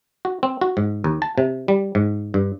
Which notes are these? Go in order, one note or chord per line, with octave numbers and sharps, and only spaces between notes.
F#4
C4
F#4
G#2
D#2
A5
C3
G3
G#2
G2